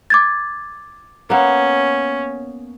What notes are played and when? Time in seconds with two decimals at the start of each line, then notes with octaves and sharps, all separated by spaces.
0.10 D6 G#6 A6
1.30 A#3 B3 C#4